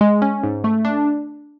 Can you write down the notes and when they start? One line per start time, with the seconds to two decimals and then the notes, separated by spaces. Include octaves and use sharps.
0.01 G#3
0.22 C#4
0.43 G#2
0.64 A3
0.85 D4